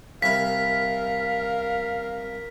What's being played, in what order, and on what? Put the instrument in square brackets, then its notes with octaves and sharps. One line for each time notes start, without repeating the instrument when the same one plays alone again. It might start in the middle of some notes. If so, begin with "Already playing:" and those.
[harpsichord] C2 E4 [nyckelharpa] A#4 [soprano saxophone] F5 [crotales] B6